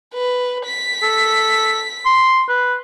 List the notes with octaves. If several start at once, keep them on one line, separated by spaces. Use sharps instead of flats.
B4
B6
A4
C6
B4